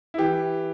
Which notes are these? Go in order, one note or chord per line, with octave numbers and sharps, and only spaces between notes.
E4
E3 G4